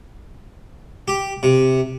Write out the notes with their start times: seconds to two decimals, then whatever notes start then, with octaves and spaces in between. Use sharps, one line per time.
1.08 G4
1.43 C3